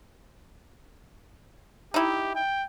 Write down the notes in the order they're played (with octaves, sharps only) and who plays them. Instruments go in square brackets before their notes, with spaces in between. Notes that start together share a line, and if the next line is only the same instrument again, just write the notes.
[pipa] D#4 E4 [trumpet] G4
[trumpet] G5